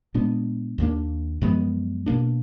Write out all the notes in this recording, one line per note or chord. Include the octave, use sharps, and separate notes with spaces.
A#2 G#3 B3 D4
D#2 D#3 A#3 D4
F#2 F3 G#3 B3
B2 A#3 D4